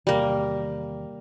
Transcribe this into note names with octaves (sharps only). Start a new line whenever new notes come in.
E2 C3 D#3 G3 A#3